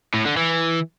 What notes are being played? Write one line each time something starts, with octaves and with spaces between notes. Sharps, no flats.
A2
D3
E3